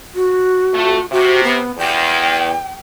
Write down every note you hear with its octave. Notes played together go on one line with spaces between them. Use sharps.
F#4
F2 A3
C3 F#4
B3
E2 G5